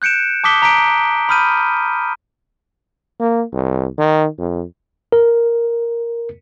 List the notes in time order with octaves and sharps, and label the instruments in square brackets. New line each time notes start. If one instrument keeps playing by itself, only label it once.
[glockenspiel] F#6 G6 C#7 D7 E7
A5 D6 D#6 B6 G7
A#5 B6 D7
B5 D#6 F6 G6 D#7
[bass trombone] A#3
C2
D#3
F2
[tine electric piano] A#4